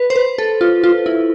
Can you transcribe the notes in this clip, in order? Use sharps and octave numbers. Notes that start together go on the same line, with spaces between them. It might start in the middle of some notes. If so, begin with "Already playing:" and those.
Already playing: B4
C5
B4
A4
F4
F4
E4